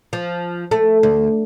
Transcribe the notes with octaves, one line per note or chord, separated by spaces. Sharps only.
F3
A3
D2